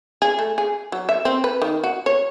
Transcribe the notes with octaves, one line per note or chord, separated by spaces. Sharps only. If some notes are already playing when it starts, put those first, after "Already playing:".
G#4
A3
G#4
F#3
E5
C4
B4
D#3
F#4
C#5